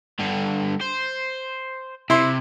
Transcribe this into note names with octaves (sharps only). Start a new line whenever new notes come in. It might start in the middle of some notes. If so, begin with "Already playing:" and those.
G2 D3
C5
C3 E4 C6